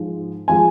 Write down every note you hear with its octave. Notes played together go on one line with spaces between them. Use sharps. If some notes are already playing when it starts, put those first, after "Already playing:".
Already playing: G#2 F3 G#3
F3 G#3 G#5